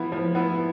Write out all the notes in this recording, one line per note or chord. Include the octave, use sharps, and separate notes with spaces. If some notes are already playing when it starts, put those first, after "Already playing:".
Already playing: F3 B3 E4
F3
B3 E4